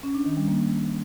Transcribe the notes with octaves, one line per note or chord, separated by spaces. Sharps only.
C#4
D4
D#3
G3
A#3